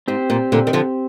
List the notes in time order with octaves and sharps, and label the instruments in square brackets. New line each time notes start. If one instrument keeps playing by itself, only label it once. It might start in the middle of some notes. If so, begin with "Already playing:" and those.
[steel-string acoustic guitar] G#2 [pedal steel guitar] C4 G4 C5
[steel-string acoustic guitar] A#2
A#2 D3
D#3
D3 F3